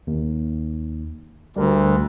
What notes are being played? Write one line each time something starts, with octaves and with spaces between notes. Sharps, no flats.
D#2
D2 G3 A#4